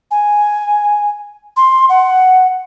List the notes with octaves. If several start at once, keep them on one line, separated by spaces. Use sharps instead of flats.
G#5
C6
F#5